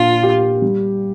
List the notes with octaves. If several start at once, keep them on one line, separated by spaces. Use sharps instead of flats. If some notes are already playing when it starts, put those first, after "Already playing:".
Already playing: A#2 D4 F4
G4
G3